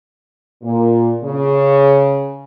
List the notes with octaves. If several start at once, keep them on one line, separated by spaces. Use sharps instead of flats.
A#2
C#3